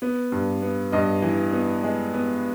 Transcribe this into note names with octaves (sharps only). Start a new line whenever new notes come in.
B3
G2
B3
G2 D#5
E3
B3
G#3
B3